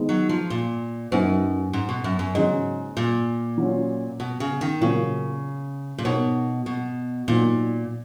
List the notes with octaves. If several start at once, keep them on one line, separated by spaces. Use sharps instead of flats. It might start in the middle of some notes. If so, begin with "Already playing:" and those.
Already playing: D#3 G#3 B3 D#4 G#4
F#3
F3
A#2
F#2 A#3 D#4 F#4 B4
G#2
B2
F#2
F#2
G#2 C#3 F#3 C#4 G#4 D#5
A#2
F#3 C#4 F4
B2
C#3
D#3
A#2 C#3 F#3 A#3
A#2
B2 B3 D#4 A#4 C#5
B2
A#2 F#3 A#3 D#4 F#4 A#4